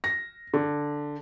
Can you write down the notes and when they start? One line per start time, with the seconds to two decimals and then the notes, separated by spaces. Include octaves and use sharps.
0.04 A#6
0.54 D3